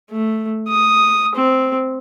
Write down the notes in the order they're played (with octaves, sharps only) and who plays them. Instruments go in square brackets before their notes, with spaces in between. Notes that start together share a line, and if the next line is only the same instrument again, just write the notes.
[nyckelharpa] A3
D#6
C4